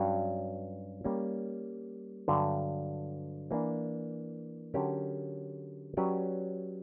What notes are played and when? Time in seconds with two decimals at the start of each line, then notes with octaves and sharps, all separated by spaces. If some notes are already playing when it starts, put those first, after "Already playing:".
Already playing: G2 F#3 C#4 F#4 C#5
1.04 G3 A#3 C#4
2.28 G2 D3 F#3
3.51 E3 A#3 D4
4.74 D3 F#3 C#4 G4 A#4
5.97 F#3 C#4 G4 B4 D5